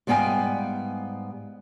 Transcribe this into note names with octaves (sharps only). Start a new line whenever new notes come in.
G#2 G3 B3 F5 G5 G#5